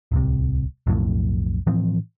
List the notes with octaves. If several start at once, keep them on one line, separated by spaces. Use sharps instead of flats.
D1 C2 C3
B1 F2 A2
A2 E3 F3 C4